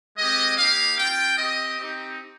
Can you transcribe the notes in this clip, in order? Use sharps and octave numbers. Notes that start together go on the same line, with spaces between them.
G#3 C4 G4 D#5
A#3 D#4 G4 F5
C4 F4 G5
C4 G4 D#5
C4 D#4 G4